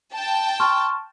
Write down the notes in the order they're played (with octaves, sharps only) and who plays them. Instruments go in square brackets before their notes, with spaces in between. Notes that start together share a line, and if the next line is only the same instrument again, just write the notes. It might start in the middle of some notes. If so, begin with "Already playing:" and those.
[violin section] G5 A5
[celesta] C6 C#6 F6